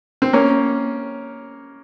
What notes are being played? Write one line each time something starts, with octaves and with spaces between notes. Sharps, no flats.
C4
A#3 C#4